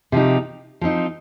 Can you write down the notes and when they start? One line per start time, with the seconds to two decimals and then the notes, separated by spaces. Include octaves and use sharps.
0.12 C3 F3 C4 D#4 G4
0.81 F3 C4 D#4